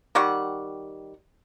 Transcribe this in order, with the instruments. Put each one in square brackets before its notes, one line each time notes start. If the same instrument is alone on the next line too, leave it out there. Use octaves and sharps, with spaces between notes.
[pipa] D#3 G3 F#5 C#6